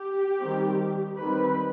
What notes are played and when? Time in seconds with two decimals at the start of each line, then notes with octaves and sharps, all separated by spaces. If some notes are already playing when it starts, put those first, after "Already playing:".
Already playing: G4
0.41 D#3 G3 C4
1.20 D#3 G3 C4 B4